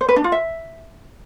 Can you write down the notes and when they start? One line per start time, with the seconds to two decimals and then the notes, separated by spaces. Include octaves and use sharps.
0.01 C5
0.09 B4
0.16 D4
0.24 F4
0.32 E5